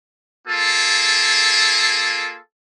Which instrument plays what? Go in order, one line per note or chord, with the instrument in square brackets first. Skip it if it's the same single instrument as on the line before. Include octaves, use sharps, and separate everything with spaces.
[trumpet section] A#3 F4 G#4 A4